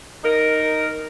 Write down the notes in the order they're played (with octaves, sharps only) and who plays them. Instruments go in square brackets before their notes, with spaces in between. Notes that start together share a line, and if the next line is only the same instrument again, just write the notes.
[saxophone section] D#4 A#4